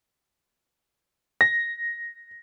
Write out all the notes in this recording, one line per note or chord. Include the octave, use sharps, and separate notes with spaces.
A#6